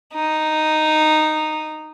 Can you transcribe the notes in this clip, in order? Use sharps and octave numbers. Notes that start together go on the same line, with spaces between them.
D#4